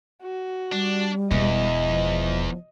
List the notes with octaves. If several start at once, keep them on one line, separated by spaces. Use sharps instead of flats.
F#4
G3 D4
E1 E2 D#5
F3